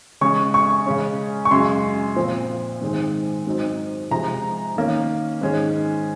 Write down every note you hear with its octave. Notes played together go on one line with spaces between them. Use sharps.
C#3 G#3 C#4 C#6
C#6
C#3 G#3 C#4
C#6
F#2 C#3 G#3 C6
A#2 F3 C4
G#2 D#3 G#3 C4
G#2 F#3 C4 D#4
C3 F3 G#3 A#5
D#3 A#3 C#4
G#2 D#3 G#3 C#4